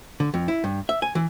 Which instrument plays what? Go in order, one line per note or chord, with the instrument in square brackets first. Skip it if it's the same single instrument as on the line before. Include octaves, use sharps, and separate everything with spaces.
[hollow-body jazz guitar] D3
F2
E4
G2
E5
G#5
E3